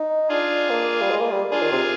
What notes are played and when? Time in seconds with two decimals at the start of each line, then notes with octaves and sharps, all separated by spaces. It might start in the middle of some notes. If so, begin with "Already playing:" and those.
Already playing: D#4
0.29 D4 F4 G#4
0.70 A#3
1.01 G3
1.11 G#3
1.21 A#3
1.31 G3
1.51 D4 F4 G#4
1.62 D#3
1.72 C3